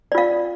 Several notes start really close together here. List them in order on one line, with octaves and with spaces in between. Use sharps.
D5 F4 F5